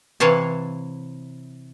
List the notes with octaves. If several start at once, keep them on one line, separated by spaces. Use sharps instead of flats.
C3 E3 C#5 F5 A5